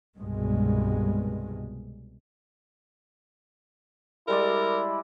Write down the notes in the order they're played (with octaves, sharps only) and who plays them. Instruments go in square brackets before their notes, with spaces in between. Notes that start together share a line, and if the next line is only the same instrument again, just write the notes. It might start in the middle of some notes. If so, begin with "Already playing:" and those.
[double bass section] C2 G2 B2 G#3
[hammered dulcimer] G3 G#3 D5 [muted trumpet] E4 [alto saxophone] A#4